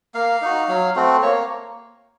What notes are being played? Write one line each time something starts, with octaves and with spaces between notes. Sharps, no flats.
A#3 F5
D#4 F#4
F#3
A3 C4 F#4
A#3 C#5